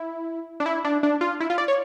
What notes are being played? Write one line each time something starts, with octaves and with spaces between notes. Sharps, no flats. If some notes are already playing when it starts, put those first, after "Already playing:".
Already playing: E4
D4
E4
D4
D4
F4
E4
F4
D5
C#5